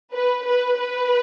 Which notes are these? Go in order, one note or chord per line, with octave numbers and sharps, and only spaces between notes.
B4
B4
B4